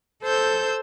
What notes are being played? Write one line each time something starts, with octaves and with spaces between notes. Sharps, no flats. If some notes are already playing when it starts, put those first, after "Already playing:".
A4 C5 E6 G6